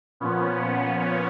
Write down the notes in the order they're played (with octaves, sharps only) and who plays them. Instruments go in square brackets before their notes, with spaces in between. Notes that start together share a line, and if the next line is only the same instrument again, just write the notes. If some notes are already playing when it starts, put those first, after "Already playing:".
[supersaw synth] A#2 F3 B3 C#4
B3 C#4